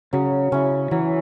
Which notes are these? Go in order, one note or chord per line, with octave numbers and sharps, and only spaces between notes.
C#3 F#3
C#3 C#4 E4
E3 F#3